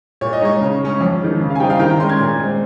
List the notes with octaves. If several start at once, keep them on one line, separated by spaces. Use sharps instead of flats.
A#2 C#5
D#5
G#3 D#4 C#5
C#3
G#3 C#4
F2
D#3 G#3
C#3
F5
G#5
G3 C4 D#4 G5
F5
D#3 G5
A#5
G#3 C#4 C6
G#6
A#2
G#3 C4